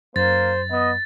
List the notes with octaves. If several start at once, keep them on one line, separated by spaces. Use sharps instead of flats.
F#2 A#3 C5 A6
B3 D#5